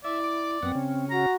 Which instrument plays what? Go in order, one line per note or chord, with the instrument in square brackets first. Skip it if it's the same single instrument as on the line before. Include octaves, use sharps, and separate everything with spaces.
[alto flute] E4 [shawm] D5 [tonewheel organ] E5
[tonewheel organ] D6
[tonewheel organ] F#2 B3 F#5 [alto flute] C4
[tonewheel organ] C#3 C#4
[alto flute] F#4 [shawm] A#5